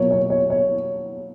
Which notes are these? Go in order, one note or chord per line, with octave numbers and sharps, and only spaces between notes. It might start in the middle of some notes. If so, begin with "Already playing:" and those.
Already playing: B2 F#3 A#3 F4 C#5
C#5
C#5
C#5